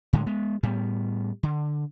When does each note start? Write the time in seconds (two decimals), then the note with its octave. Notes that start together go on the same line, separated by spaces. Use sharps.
0.13 A2 D3 G#3
0.26 G#3 B3
0.63 A2 G3 B3
1.43 D3